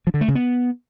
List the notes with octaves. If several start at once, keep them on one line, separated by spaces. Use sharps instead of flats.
F3
D3
A3
C#3
B3